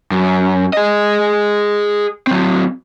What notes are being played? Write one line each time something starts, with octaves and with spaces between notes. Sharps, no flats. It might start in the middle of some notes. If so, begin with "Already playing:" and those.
F#2
G#4 D#5
F#3 C4